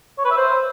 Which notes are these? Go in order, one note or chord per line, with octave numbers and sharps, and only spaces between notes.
C#5
B4
E5
C5